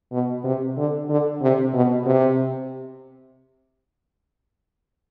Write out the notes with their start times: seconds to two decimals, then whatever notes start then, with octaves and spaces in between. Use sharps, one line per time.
0.12 B2
0.44 C3
0.78 D3
1.09 D3
1.42 C3
1.74 B2
2.06 C3